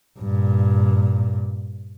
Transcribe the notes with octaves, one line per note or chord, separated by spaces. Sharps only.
G2 A#2